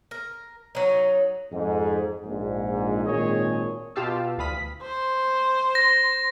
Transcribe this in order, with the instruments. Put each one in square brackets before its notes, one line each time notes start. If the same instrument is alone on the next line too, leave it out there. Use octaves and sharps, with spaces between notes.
[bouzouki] A#4
F#3 D#4
[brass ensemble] F2 G#2
A#1 G#2
G#1 A#2 G#4 C#5 D#5
[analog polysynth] B2 F4 G4 F5 A5 E6
D2 E3 F5 B5 D#6 B6
[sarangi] C5
[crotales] A#6